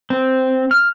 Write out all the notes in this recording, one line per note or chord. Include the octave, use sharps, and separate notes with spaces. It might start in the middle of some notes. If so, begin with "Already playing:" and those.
C4
F6